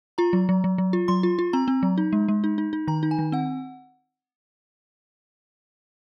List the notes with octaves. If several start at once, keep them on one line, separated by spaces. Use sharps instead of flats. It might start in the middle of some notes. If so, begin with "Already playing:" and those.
F4 A#5
F#3
F#3
F#3
F#3
F4
F#3 C6
F4
F4
C4 A#5
C4
F#3
D#4
G#3
G#3
D#4
D#4
D#4
D#3 A#5
D#4
G#5
D#3
C4 F#5